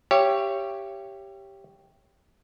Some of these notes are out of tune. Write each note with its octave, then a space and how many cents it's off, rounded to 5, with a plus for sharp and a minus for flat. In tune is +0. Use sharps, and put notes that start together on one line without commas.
G4 +0 C#5 +0 E5 +45